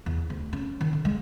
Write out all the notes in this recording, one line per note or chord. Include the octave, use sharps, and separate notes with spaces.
E2
D2
C#4
D#3
D3
G#3